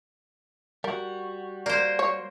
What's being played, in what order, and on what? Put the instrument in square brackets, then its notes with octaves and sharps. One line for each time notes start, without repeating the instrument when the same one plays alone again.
[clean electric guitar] G3 F#4 [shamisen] A#4
[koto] A#3 C5 [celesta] D5
[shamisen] C#5